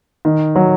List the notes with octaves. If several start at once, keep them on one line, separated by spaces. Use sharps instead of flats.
D#3
F#3